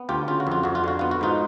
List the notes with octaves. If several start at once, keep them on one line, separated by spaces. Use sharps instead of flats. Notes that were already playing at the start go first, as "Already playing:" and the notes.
Already playing: B3
D2 F4 G4
C#3 F4
F#4
F2 F4
F2 F#4
F4
D3 F#4
B3 F4
F#4
G#2 D#4 F4